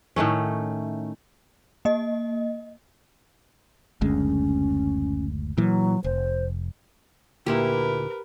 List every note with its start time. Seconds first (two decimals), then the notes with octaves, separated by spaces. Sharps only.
0.16 A2 D#3 A3 C#4
1.85 A#3 D#5
4.01 F#1 D2 G#3 C#4
5.57 A#2 E3 F#3
6.04 F1 C5
7.46 D2 A#2 E4 G4 A#4 B4